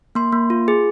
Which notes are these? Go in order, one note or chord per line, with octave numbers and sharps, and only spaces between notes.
A#3 C6
A#3
F4
G#4